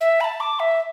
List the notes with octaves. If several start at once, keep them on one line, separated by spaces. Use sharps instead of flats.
E5
B5
A5
D6
E5